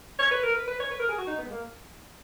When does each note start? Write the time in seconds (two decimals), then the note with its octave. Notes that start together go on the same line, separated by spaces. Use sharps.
0.19 C#5
0.31 B4
0.43 A#4
0.55 B4
0.68 B4
0.80 C#5
0.91 B4
1.00 A#4
1.09 G#4
1.18 F#4
1.27 D#4
1.38 B3
1.46 G#3
1.51 A#3